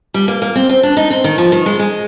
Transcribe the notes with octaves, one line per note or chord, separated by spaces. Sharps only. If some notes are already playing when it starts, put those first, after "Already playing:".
G3
A#3
A#3
C4
C4
D4
D#4
C4
D#3
F3
D#3
G#3
G#3